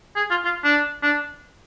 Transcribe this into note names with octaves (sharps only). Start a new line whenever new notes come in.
G#4
F4
F4
D4
D4